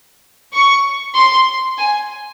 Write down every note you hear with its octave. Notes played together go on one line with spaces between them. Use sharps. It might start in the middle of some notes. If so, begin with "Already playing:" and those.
C#6
C6
G#5